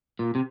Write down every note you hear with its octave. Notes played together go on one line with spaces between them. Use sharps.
A#2
C3